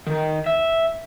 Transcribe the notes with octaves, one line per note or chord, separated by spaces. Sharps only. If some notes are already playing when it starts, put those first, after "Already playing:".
D#3
E5